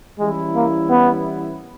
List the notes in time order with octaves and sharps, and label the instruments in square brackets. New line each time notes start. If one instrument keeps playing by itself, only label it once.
[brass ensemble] E3 G3 C#4 E4 [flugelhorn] G#3
[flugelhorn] A#3
B3